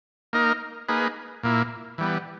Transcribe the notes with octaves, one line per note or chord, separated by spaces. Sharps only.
A#3 D#4 A#4
A#3 D#4 G#4 B4
A#2 A#3 E4
E3 G3 B3